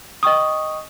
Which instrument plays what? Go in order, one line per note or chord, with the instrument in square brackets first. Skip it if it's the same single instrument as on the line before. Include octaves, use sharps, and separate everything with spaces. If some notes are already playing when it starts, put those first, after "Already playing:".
[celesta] D#5 G5 C#6 D#6